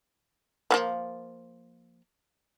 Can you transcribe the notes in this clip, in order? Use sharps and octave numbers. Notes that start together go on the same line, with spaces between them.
F3 A#3 B3